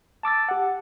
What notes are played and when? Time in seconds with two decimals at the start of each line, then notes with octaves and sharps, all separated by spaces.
0.23 A5 D6 E6 A6
0.49 G4 F#5